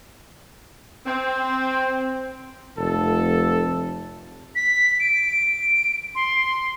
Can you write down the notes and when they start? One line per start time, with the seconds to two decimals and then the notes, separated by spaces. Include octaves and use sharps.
1.05 C4
2.78 F1 A4
4.55 B6
5.00 D7
6.15 C6